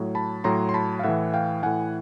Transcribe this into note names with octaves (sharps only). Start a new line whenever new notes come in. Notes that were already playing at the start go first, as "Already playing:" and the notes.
Already playing: A2 F#3
A5 B5
A2 F#3 A#5 C6
C6
A5 B5
F5
A2 E3 E5 F#5
F5 G5
A2 E3 F#5 G#5